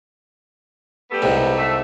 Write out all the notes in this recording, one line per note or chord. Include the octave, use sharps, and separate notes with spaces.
G3 A3 B3
C2 G#2 C3
A3